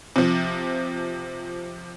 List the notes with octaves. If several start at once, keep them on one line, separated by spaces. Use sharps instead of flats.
C3 F3